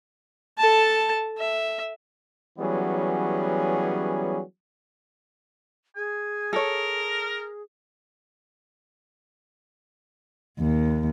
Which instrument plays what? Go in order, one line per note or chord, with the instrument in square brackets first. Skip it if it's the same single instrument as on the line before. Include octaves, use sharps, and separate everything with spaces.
[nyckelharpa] A4 A5
E5
[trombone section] E3 F#3 G3 B3 C#4 G#4
[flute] G#4 [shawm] G#5
[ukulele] A4 C#5 [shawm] A#4
[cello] D#2